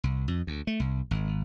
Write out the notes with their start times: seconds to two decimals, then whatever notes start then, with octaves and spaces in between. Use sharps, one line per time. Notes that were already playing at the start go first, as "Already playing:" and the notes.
0.04 C2
0.28 F2
0.47 D2
0.67 A3
0.80 C2
1.11 G#1